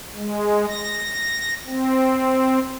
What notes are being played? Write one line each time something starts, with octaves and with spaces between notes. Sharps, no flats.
G#3
A#6
C4